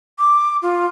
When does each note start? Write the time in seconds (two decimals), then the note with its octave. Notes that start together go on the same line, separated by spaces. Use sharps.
0.18 D6
0.62 F4